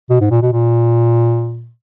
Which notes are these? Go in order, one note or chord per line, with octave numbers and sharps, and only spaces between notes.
B2
G#2
A#2
B2
A#2